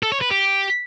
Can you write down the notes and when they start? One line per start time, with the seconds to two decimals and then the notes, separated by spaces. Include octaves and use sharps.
0.03 A4
0.12 C#5
0.21 B4
0.31 G4